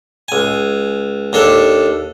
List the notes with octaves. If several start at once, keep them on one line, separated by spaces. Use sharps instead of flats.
C#2 G#5
D#2 D4 A4